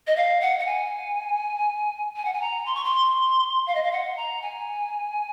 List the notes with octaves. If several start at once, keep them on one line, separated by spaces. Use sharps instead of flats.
D#5
F5
F#5
F#5
G#5
G#5
F#5
G#5
A#5
C6
C#6
C6
F5
D#5
F5
F#5
A#5
G#5